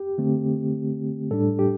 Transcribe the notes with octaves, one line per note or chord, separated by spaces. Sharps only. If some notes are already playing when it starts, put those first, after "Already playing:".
Already playing: G4
D3 A3 C4
A2 G3 D4 A4
G4